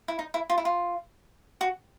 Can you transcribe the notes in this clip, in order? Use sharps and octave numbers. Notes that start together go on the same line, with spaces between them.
E4
D#4
E4
F4
E4
F4
F#4